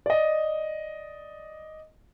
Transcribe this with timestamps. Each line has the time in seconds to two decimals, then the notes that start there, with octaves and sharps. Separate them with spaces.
0.06 D5 D#5